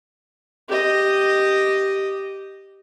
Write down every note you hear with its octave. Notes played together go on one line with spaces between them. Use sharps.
G4 D#5